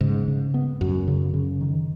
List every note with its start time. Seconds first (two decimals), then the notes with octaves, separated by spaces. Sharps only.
0.01 G#2 C#3
0.28 C#3
0.54 B3
0.81 F#2 F#3
1.07 C#3
1.34 C#3
1.61 D#3